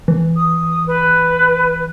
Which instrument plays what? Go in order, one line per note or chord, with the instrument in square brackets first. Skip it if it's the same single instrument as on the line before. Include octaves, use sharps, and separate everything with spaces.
[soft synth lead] E3
[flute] D#6
B4